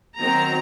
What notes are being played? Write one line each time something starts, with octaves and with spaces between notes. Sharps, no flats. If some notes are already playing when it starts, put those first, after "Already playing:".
D#3 F#3 C4 A#5